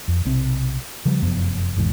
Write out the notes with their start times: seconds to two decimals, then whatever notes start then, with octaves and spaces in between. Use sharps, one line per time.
0.08 F2
0.25 B1 C3 C4
1.05 C#3 F3 G3
1.22 F1 F#2 F3 B3
1.77 G#1 E2 G#2 B2